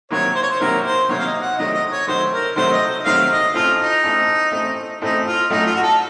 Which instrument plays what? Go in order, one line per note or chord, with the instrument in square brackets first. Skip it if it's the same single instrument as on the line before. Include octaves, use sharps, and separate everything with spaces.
[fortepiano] C3 D#3 F#3 A#3 [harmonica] C#5
[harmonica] C5
C#5
C5
[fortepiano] C3 D#3 F#3 A#3 [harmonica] A#4
[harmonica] C5
[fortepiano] C3 D#3 F#3 A#3 [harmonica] C#5
[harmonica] F5
D#5
F#5
[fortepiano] C3 D#3 F#3 A3 C4 [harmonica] D#5
[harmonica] D#5
C#5
[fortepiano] C3 D#3 F#3 A3 C4 [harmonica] C5
[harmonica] A#4
[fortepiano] C3 D#3 F#3 A3 C4 [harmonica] C5
[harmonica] D#5
[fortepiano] C3 D#3 F#3 A3 C4 [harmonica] F5
[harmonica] D#5
[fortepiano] A1 A2 A3 C4 [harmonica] F4
[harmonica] D#4
[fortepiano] A1 A2 A3 C4
A1 A2 A3 C4
[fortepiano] A1 A2 A3 C4 [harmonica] D#4
[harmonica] F4
[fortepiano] A1 A2 F#3 A3 [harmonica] D#4
[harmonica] F4
F#4
A4